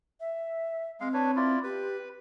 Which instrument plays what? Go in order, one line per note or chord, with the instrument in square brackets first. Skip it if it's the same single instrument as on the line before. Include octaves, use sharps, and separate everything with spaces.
[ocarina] E5
[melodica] G#3 F5 [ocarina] C4
[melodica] D4 B4 C#5
E4 F4 D5
[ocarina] G4 [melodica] B4